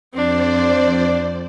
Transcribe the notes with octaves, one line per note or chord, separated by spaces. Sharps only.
F2 C4 D4 C5 D5